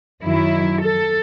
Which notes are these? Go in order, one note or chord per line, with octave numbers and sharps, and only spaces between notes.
F#2 D#3 F#3 E4
A4